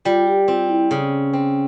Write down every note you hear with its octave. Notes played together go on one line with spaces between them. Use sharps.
G3 F4
G4
C4 F4
E4
C#3 C#4
C4